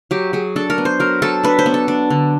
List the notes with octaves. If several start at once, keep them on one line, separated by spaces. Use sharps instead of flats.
F#3 G4
F#3 G#4
D4 A4
A#4
B3
C5
F#3 A#4
F#3 A4
D4 B4
C5
B3
A4
D4
D3